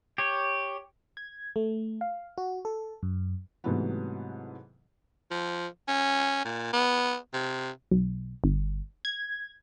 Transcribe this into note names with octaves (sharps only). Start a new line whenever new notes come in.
G4 C#5
G#6
A3
F5
F#4
A4
F#2
G#2 C3 E3 F#3 A3 B3
F3
C#4
A#2
B3
C3
B1
G1
G#6